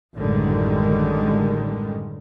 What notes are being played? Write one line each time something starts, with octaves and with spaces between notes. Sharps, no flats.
A1 F#2 D3 D#3 G3 G#3